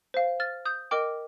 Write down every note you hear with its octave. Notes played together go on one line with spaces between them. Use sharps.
C5 F5
F6 A6
D#6 G6
A#4 D#5 G5 D6 F6